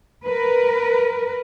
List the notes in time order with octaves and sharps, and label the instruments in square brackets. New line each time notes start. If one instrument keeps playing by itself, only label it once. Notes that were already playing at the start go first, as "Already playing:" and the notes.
[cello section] A#4 B4